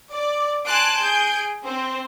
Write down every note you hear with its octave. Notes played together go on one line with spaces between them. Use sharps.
D5
G#5 A5 C6 F#6 D7
G#4 G6 D7
C4